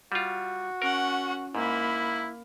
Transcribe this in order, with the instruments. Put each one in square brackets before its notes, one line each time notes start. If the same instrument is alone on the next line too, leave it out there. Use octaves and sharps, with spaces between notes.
[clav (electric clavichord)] G3 F4 [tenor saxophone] F#4
[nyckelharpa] C#4 F#5 [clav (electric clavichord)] A#4
[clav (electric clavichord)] G#2 [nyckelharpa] A#3 B5 [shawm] E4